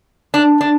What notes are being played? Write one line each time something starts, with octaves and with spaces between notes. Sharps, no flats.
D4
D4